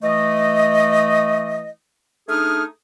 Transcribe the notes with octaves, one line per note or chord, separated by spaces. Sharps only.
E3 A3 D#5
A3 D4 D#4 G#4 D#6 F6